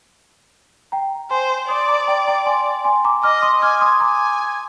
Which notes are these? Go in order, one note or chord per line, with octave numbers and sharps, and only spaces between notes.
G5 A#5
C5 G#5 C6
D5 C6 D#6
A#5 D6
G5 A#5
G5 A#5
G#5 C6
G#5 C6
A#5 D6
D#5 D6 F6
C6 D#6
G#5 D6 F6
C6 D#6
G#5 A#5 D6